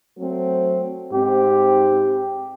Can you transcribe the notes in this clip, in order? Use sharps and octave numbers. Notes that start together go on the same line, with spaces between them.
F#3 A3 C4
G#2 C4 G4